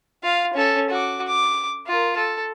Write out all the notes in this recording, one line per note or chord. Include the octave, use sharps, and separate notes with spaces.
F4 F5
C#4 A4
F#4 D6
D6
F4 A#4
A4